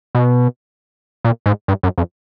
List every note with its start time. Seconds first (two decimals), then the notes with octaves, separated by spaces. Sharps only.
0.15 B2
1.25 A#2
1.46 G#2
1.68 G2
1.83 F#2
1.98 F2